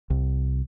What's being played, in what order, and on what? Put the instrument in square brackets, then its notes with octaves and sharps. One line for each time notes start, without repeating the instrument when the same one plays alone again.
[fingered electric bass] C2